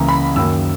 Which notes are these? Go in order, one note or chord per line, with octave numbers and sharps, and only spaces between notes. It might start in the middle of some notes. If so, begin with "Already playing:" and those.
Already playing: C#2 C#3 E3 A#3 A#5
B5
F#2 D#3 A#3 E6